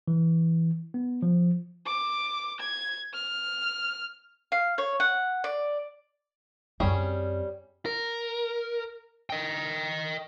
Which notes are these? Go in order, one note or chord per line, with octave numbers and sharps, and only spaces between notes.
E3
B3
F3
D6
G#6
F6
F5
C#5
F#5
D5
F#2 G3 C4 C#4 G#4
A#4
D#5 G5